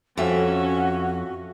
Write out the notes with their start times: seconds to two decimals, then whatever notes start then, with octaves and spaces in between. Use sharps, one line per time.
0.17 F2 C#4 F#4 E5